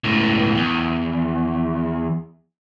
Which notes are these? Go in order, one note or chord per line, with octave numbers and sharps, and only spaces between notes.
C#2 A2
E2